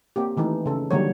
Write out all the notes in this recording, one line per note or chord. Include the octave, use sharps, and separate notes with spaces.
A#3 C4 G4
D#3 E3 A3 D#4
C#3 A4
D3 D#3 F#3 G3 A#3 C#5